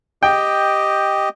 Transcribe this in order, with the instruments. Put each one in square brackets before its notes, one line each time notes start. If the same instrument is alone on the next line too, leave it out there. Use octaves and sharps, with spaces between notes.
[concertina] G4 D#5 [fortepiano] G5